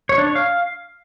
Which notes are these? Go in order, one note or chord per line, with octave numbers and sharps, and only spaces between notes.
C#5
D4
C#5
F5